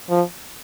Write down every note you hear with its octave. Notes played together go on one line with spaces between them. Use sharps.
F3